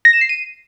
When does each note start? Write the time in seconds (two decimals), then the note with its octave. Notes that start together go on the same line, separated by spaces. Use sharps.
0.05 A#6
0.13 E7
0.21 C7
0.29 D#7